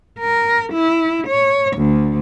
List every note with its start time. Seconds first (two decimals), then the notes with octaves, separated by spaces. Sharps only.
0.19 A#4
0.73 E4
1.27 C#5
1.77 D2